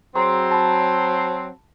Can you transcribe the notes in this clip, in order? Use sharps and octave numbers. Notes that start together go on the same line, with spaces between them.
F#3 C4 G#4 A#5 C6
A5 B5